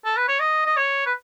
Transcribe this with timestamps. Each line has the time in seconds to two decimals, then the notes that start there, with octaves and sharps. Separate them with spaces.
0.05 A4
0.17 B4
0.28 C#5
0.40 D#5
0.66 D#5
0.77 C#5
1.06 B4